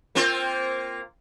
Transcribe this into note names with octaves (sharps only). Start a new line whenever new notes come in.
A#3 C4 F4